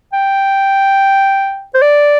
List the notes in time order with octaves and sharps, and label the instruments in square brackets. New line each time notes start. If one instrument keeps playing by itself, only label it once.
[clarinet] G5
C5
D5